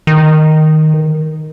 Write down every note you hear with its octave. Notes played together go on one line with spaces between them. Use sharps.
D#3